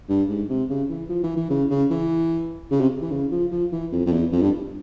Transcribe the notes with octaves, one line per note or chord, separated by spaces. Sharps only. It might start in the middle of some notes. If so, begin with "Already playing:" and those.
G2
G#2
C3
C#3
E3
F3
E3
E3
C#3
C#3
E3
C#3
C3
E3
C#3
F3
F3
E3
F2
F2
E2
F2
G2